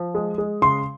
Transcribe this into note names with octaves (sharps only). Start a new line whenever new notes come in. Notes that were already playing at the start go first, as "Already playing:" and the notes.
Already playing: F3
G#3
G#3
C#3 C6